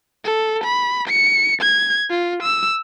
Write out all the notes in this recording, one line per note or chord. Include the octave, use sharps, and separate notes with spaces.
A4
B5
C#7
G#6
F4
E6